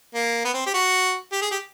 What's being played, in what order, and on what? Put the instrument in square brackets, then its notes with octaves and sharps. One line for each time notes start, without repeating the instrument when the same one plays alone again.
[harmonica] A#3
B3
C4
G4
F#4
G4
G#4
G4